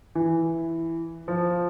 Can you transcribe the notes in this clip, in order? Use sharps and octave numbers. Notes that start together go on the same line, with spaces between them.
E3
F3